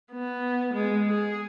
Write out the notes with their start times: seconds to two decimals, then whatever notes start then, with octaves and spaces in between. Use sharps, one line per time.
0.12 B3
0.74 G#3
1.08 G#4